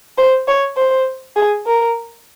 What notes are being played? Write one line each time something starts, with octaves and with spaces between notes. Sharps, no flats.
C5
C#5
C5
G#4
A#4